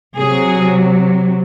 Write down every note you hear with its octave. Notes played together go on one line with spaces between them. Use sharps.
C3 F#3 G#4